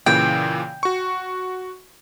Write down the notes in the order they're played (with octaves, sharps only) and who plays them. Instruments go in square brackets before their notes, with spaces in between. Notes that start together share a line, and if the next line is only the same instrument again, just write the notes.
[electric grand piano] A#2 C#3 E3 [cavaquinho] G5
[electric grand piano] F#4 C#6